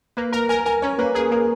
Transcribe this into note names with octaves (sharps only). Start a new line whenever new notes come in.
A#3 B4
A#4 A#5
A#4 G#5
A#4 G#5
C#4 C#5
A#3 B4
G#4 A#4
A#3 A#4